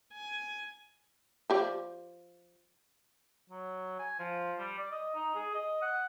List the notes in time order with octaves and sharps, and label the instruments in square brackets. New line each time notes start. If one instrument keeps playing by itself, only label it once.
[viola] G#5
[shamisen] F3 G4 D5
[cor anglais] F#3
G#5
F3
G3
D5
D#5
D#4
G#4
D#5
F#5